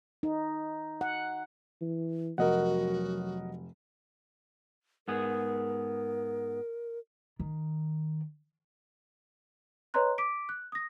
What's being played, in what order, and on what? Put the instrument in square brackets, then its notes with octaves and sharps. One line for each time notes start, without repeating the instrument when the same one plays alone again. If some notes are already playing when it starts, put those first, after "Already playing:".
[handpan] D#4
F#5
[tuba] E3
[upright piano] F1 [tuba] F#3 [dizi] F#4 [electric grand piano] A#4 D#5 F#5
[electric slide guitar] G#2 B3 G#4 [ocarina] A#4
[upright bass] D#3
[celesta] B4 C#5 D#5 A#5 C6 F#6
D6 B6 D7
F#6
D#6 A#6